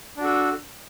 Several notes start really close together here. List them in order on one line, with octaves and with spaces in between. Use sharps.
D4 F#4 A4